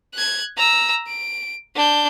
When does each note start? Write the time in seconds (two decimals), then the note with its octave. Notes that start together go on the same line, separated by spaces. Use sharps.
0.14 F#6 G#6
0.57 A#5 E6
1.07 D7
1.76 D4 G6